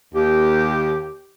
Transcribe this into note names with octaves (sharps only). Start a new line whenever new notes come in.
D#2 G4